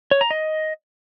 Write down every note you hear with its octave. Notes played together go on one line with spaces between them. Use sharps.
C#5
A#5
D#5